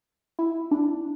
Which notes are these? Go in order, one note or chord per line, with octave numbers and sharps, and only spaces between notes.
E4
D4